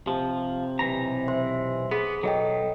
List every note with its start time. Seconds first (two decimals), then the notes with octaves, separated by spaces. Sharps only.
0.07 C3 F3
0.79 B1 E3 A#5
1.28 C5 E5 C6
1.91 B3 G#4
2.23 B1 F#3 A4 D#5 G5